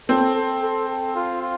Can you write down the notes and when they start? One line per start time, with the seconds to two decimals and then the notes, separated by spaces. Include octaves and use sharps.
0.09 C4 A4
0.35 A4
0.62 A4
0.88 A4
1.16 F4
1.42 F4